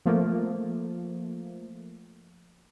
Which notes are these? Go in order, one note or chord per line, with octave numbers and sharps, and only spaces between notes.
F3 A3 A#3